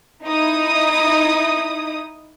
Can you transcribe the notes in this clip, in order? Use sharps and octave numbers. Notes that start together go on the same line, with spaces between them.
D#4 E4 D#6